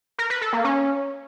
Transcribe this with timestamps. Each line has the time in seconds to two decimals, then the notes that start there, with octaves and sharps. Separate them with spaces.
0.18 A#4
0.30 B4
0.41 A4
0.53 A#3
0.64 C#4